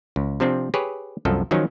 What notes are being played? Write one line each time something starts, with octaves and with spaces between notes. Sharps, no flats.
C#2
C3 F3 C4 D4
G4 G#4 B4 C#5
C2 F#2 F3 A4
D#3 F3 F#3 C#4 D#4